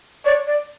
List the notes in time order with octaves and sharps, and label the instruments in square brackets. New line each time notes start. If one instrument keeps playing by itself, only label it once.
[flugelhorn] C#5 [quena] D5
[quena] D5